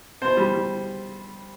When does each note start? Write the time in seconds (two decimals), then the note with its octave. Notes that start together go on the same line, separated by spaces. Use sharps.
0.22 B2 C5
0.37 G3
0.53 G3